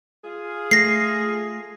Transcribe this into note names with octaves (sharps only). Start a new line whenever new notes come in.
F4 G#4
A3 A#6 C7